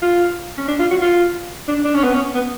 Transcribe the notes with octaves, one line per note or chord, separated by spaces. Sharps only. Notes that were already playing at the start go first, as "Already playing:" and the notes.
F4
C#4
D4
F4
F#4
F4
D4
D4
C#4
B3
C#4
B3